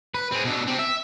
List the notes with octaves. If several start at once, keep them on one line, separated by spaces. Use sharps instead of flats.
B4
C4 G#4
B2 D3
C4 G4
E5